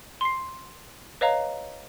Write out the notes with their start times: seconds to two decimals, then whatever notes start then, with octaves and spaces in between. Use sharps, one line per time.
0.21 C6 C7
1.21 B4 C#5 D#5 F5 A#5